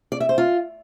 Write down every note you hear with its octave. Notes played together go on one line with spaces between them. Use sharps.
D5
E5
C5
F4